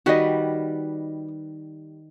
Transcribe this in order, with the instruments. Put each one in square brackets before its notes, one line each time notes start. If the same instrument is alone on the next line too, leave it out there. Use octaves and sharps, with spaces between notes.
[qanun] D#3 G3 B4 [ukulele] F#4 D#5